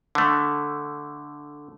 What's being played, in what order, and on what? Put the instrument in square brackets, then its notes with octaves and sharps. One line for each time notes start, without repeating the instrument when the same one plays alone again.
[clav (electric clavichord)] D3 A3